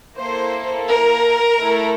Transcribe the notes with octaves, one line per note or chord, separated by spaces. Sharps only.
A#3 E4 A4 C5
A#4
A3 E4 A4